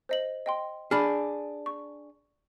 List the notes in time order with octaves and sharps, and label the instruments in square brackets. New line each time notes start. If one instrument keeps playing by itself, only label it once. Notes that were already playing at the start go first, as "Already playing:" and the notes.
[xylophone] C5 D#5 F#7
D#5 G5 C6
[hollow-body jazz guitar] D4 G#4 [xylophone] B5 F6
[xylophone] C#6